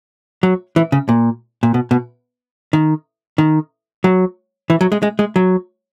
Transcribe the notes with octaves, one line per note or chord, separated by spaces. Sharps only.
F#3
E3
C#3
A#2
A#2
B2
B2
D#3
D#3
F#3
E3
F#3
G#3
G#3
G#3
F#3